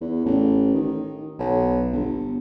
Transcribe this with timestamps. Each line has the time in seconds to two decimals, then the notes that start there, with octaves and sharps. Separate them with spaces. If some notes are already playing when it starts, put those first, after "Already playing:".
0.01 E2
0.25 A1
0.75 D#3
1.39 B1
1.93 G1